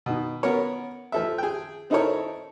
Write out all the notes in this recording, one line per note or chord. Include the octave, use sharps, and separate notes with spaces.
B2 D#3
B3 C#4 A#4 C#5
F3 A4 E5
G#4 G5
C4 D#4 E4 A4 A#4 C#5